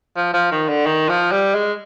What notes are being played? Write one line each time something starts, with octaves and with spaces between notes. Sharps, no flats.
F3
F3
D#3
D3
D#3
F3
G3
G#3